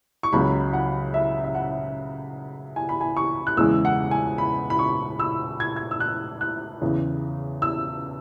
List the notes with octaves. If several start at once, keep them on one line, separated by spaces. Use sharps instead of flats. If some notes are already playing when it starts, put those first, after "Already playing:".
C#6
C#2 C#3 F#3 B5
F#5
E5
E5
F#5
G#5
B5
G#5
C#6
F#6
E2 C#3 E3 G#3 E6
F#5
G#5
B5
B5
C#6
E6
G#6
G#6
E6
F#6
F#6
E2 C#3 E3
E6